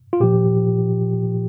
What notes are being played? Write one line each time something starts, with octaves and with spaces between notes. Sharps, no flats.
F4
A#2 F3 G4